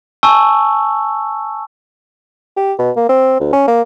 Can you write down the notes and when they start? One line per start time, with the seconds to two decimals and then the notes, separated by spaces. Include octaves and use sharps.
0.23 G#5 A5 C#6 E6
2.57 G4
2.79 B2
2.97 A#3
3.09 C4
3.41 D2
3.53 C#4
3.68 A#3